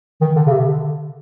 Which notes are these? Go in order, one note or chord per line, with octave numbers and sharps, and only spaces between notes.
D#3
D3
C#3
C3
D3